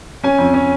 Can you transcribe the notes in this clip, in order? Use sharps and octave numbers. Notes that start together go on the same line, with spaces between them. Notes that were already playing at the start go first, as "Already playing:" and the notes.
C#4 G#5
F2
C#4